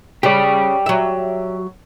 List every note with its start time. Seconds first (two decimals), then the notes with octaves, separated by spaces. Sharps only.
0.23 C#3 G4 D5
0.86 F#3 E5